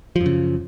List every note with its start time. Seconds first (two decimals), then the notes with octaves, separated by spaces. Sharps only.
0.16 F3
0.21 F#2
0.26 C#3